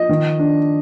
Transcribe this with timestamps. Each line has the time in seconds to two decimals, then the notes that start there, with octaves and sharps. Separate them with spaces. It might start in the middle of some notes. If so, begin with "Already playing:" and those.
Already playing: F3 D#5
0.09 D#3
0.39 D4